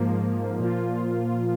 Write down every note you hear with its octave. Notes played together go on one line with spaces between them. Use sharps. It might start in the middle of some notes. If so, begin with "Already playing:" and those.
Already playing: G#2 F3 A#3
A#2 F3 A#3 F4